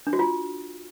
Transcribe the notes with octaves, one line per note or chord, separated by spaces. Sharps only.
D4
F#4
F4